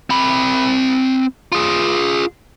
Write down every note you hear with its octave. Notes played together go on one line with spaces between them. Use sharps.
C4 B5
F4 G#4